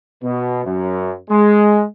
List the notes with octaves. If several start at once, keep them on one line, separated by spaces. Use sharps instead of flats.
B2
F#2
G#3